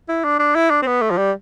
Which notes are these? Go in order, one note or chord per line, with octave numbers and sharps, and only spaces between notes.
E4
D4
D4
E4
D4
C4
B3
A3
F3
G3